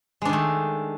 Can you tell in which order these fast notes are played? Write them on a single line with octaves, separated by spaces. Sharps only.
G#3 D4 D#3 A3